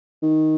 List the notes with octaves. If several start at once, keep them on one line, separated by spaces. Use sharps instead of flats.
D#3